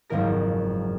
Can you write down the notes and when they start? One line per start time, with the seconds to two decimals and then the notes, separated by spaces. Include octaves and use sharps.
0.10 F#1 F2 G#2 D#3 A#4 A#6